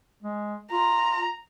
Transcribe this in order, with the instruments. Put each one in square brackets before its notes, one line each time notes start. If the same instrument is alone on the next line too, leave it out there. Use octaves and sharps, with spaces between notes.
[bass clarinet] G#3
[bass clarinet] F4 [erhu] A#5